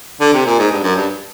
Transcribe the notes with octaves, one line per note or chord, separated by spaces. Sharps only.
D3
C3
A#2
G#2
G2
F#2
G2